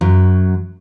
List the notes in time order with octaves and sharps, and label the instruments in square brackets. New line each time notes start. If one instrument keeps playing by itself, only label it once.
[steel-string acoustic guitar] F#2 F#3